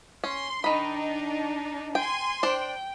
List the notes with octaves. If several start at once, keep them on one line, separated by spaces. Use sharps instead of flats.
C#4 C6
D#3 D4 D#4 B5
G5 G#5 C6
D4 C5 G5